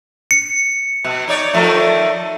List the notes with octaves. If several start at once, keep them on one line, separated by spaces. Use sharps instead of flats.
C#7
B2
D#4 C#5 D5
D#3 F3 A3